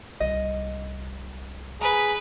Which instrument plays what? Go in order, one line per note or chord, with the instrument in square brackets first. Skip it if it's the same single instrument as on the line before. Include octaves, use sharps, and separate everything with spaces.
[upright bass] C2 [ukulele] D#5
[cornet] G#4 [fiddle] B4 [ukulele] A#5